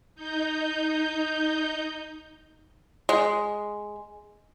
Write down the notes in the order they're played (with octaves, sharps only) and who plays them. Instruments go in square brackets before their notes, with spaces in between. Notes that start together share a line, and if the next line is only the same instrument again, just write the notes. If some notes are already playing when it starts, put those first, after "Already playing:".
[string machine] D#4 G6
[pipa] G#3